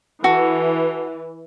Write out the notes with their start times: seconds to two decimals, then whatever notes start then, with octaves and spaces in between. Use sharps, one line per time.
0.24 E3 F#4 A4